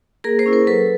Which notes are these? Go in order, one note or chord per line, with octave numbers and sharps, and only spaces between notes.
A#3 G#4 A#4
A#4 C5
C#4 E4
A#4 C5
F#3 A4 B4